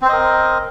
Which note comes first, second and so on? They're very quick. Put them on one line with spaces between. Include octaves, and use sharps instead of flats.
C4 C5 D#5 A#4